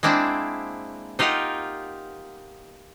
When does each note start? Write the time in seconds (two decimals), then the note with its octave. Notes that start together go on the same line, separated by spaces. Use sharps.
0.03 G#3 A#3 C4 D4 E4
1.19 D#4 F4 G4 A#4 F#5